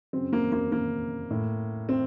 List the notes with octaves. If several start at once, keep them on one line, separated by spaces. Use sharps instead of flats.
F#2 C#3 C4
A#3
A#3
A#3
A2
C4